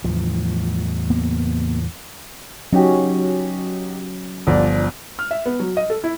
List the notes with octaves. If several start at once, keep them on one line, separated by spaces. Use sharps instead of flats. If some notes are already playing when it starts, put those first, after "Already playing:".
E2 A2 F3
A#3 B3
F#3 C#4 D#4 F#4 G4
G1 F3 D5
F6
E5
B3
F#3
D#5
A4
E4